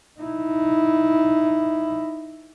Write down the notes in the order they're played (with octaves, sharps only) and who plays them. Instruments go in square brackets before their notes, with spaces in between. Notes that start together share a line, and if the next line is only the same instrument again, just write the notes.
[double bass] D#4 E4